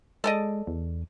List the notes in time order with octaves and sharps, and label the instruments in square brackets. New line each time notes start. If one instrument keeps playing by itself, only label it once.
[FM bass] G#3 [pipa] A4 D5 D#5
[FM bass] E2